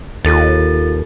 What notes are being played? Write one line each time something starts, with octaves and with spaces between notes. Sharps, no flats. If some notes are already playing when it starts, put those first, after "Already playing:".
D#2 F4 A4 A6